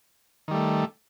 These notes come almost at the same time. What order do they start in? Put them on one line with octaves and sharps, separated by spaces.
D#3 G3 A3